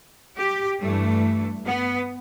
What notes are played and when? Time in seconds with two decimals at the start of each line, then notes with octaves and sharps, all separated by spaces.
0.37 G4
0.79 G2 E3 A3
1.65 B3